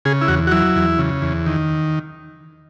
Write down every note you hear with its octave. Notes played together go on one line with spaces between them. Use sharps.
C#3 G#4
E4
E2 F#4
F#4
F#3 E4
E2
C#3
E2
D#3